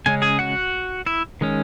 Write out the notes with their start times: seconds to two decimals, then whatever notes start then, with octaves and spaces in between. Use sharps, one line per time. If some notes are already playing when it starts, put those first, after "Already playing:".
0.06 C#3 G#3 C#4 G#5
0.22 G#4 G#5
0.39 F#4 F#5
1.06 E4 E5
1.41 D#3 G#3 C#4